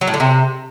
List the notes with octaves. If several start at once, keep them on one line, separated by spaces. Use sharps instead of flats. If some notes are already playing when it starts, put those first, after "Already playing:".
F#3
A2
D3
C3